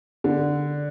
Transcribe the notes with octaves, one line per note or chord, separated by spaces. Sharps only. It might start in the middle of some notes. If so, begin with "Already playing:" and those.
D3